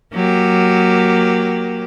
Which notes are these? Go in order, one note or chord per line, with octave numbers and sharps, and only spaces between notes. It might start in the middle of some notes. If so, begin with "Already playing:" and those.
F#3 A#3 G4